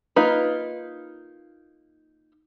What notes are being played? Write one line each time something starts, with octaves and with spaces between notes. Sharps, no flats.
A#3 D#4 F4 B4